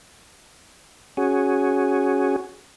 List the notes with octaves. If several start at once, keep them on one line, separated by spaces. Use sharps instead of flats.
C#4 F#4 G#4